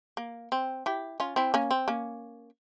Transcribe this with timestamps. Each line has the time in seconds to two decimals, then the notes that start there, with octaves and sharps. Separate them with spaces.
0.17 A#3
0.52 C4
0.86 E4 G4
1.20 C#4 F4
1.36 C4 E4
1.54 A#3 C#4
1.71 C4
1.88 A#3 C#4